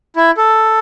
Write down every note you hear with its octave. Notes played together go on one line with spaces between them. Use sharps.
E4
A4